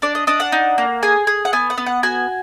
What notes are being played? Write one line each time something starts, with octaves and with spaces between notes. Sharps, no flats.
D4 D5
D#5
D4 D#5
F#5
D#4
A#3
G#4 G#5
G#4
F#5
B3 G#5
F#5
B3
F#5
F#4 G#5